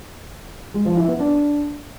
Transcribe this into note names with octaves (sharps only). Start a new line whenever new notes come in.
G#3
F3
E4
B3
D4